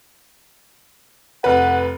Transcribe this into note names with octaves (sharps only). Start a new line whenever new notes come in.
F1 B4 F#5